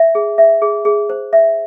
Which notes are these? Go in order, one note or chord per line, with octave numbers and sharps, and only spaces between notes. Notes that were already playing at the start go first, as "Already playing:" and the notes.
Already playing: E5
G#4
E5
G#4
G#4
C5
E5